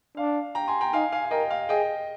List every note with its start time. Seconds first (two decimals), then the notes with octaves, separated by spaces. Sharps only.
0.17 D4 F5
0.55 G5 A#5
0.68 G#5 C6
0.81 G5 A#5
0.93 D#4 F5 G#5
1.12 F5 G#5
1.25 F5
1.31 A#4 D#5 G5
1.50 F5
1.69 G#4 D#5 G5